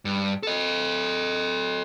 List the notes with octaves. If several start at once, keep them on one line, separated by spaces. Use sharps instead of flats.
G2
A4 D#5